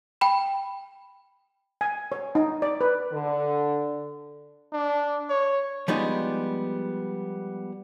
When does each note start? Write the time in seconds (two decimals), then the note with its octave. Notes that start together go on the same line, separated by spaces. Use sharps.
0.21 G5 B5
1.81 G#5
2.12 C#5
2.35 D#4
2.62 D5
2.81 B4
3.12 D3
4.73 D4
5.30 C#5
5.88 F3 G3 G#3 B3 D#4 D5